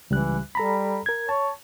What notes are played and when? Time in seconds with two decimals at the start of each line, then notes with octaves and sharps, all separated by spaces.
0.11 C#2 E3 G3 F#6
0.55 G3 A4 A#5 B5
1.06 A#4 G#6
1.29 C#5 A5